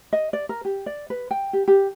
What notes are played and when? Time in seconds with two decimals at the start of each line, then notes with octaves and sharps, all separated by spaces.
0.13 D#5
0.33 D5
0.49 A#4
0.65 G4
0.86 D5
1.10 B4
1.31 G5
1.53 G4
1.68 G4